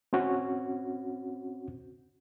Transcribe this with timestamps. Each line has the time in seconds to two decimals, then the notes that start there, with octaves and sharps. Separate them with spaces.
0.13 C4 C#4 F#4